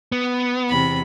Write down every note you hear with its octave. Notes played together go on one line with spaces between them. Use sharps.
B3
E2 C3 B5